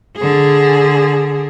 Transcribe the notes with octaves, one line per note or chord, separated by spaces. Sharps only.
D3 G#4